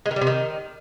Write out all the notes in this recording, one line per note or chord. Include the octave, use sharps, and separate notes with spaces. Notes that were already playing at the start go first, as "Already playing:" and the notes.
G#3
D#3
G3
C3
D#3